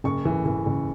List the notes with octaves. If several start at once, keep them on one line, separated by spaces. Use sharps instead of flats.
F#1 C#6
E3
E3
F#1